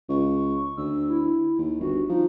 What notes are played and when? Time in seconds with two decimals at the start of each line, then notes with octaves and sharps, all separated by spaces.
0.09 C#2 C#6
0.77 D2 E6
1.09 E4
1.58 D#2
1.81 G1 F#4
2.09 F3 D#4